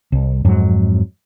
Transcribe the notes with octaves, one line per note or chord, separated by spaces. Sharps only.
C2
F2 G#2 F#3